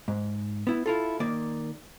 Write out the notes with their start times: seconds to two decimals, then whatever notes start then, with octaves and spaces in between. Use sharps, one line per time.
0.08 G#2
0.67 B3 E4
0.86 E4 F4 A4
1.20 D#3 A#3 D5